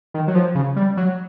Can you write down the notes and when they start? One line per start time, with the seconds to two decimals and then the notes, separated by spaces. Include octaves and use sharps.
0.14 D#3
0.28 F#3
0.35 F3
0.55 C#3
0.76 G3
0.97 F#3